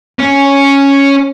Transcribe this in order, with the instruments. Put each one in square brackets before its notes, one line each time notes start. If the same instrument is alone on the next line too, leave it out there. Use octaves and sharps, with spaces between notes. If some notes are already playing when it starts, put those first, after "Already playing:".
[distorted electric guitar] C#4